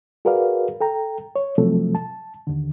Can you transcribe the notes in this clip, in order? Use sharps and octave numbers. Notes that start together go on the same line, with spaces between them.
F#4 G#4 A#4 B4 D5 F5
A4 G5 A#5
C#5
C3 F3 F#3 A3 C4 A4
A5
D#2 D3